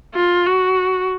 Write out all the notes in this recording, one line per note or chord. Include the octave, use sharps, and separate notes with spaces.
F4
F#4